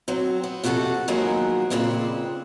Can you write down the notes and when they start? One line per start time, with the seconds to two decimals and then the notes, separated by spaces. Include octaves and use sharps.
0.08 F#3 C4
0.44 B3
0.64 F2 C3 F#4 G4 A4 F#5
1.08 D#3 F3 F#3 G#3 A#3 B3
1.70 F2 A#2 C#3 C4 B4